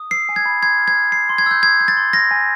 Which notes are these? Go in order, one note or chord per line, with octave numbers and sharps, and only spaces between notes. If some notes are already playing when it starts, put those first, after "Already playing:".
Already playing: D#6
E6 C7
G#5
G#6
B5
C6 G#6
F6
G#6
F6
G6 C7
C6
G#6
E6 G6
D#6 G#6
G6
A6
C6
F6 A#6
G#5